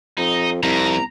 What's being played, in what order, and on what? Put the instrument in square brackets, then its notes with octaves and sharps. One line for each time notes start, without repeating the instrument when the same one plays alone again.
[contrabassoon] F2 [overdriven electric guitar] D#4
[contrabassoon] C2 [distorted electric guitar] F2 [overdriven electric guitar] A#5